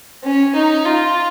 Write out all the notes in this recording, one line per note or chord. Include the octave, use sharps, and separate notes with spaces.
C#4
D#4
F4